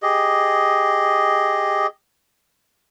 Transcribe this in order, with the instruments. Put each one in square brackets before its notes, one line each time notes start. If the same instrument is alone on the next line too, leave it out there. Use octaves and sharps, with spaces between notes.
[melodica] G4 G#4 D#5